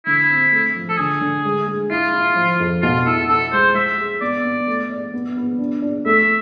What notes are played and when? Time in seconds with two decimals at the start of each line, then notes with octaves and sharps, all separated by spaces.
0.06 D3 E4
0.30 C4
0.52 A3
0.75 F3
0.89 A4
0.98 D3 G#4
1.21 D3
1.45 G#3
1.67 G#3
1.90 E4 F4
2.14 E4
2.36 F3
2.60 F2
2.83 B2 F4
3.06 E4 A4
3.29 E4 A4
3.52 G#3 C5
3.74 G#3 E5
3.98 G#4
4.21 B3 D5
4.45 B3
4.67 A3
4.90 D5
5.14 B3
5.37 B3
5.59 D4
5.82 D4
6.06 A3 E5